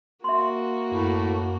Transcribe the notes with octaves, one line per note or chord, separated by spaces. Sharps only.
A#3 F#4 E5 C6
F#2 A2